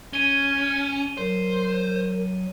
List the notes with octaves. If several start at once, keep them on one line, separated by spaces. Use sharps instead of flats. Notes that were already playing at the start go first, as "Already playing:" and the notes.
C#4 G#6 D#7 G7
F#3 A#4 C5